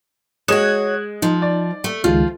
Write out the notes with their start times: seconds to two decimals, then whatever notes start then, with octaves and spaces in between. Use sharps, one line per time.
0.48 G#3 F#4 C#5 D#6 F#6 G#6 E7
1.22 F3 D#4
1.42 D5
1.84 A3
2.04 C#2 D#3 F3 G#3 F4